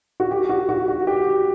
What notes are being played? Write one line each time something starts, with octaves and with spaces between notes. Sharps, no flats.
F#4
G4
F#4
F#4
F#4
G4